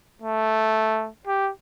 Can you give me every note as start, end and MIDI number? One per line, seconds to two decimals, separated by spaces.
0.22 1.09 57
1.27 1.50 67